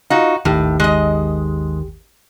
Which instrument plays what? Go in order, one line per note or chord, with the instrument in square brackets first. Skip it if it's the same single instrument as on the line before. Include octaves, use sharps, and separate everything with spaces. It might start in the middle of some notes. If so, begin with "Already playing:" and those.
[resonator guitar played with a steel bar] D#4 F#4 [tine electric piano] F4 F5
[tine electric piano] G#1 G4 [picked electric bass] D#2 D#3 [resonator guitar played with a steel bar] A2
[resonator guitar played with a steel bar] G#3 D#5